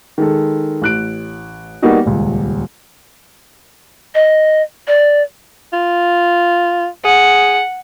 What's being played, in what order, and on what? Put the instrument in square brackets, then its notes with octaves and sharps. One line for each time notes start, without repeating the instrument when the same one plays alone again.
[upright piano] D#3 G#3 A4
A1 F#6 D7
G3 A#3 B3 D#4 F#4 G4
D#1 C#2
[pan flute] D#5
D5
[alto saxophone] F4
[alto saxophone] G#4 [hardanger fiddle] F#5